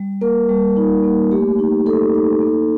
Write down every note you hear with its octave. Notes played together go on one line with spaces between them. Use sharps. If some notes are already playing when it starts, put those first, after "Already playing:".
Already playing: G3
A#3 A#4
G3
D#4
A#3
A3 G4
D#4
D#4 A4
D#4
A#3